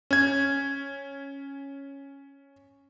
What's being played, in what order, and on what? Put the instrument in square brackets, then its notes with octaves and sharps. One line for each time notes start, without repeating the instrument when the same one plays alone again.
[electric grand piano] C#4 G#6